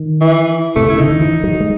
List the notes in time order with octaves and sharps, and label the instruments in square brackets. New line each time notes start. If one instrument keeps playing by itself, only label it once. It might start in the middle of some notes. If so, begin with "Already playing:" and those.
Already playing: [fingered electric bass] D#3
[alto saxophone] E3
[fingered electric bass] C3 [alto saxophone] A3
[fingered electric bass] C#3 [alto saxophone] E4
[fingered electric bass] D3 [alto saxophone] D#4
[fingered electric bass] D#3
E3
F#3
G#3